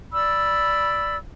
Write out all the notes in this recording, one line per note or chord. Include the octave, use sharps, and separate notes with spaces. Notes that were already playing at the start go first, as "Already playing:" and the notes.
D5 B5 E6